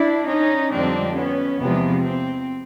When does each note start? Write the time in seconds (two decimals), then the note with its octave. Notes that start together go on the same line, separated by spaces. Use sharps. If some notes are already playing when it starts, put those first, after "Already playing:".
Already playing: D4 E4
0.27 C#4 D#4
0.70 F2 D3 G3 C4 D4
1.15 B3 C#4
1.59 E2 C3 F3 G#3 B3
2.03 C4